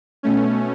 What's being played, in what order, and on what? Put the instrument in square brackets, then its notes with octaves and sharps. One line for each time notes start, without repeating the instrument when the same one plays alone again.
[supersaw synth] B2 A3 C#4